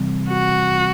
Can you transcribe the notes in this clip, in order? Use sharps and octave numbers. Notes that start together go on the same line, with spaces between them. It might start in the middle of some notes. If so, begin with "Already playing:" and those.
Already playing: C3 E3 G3 C4
F#4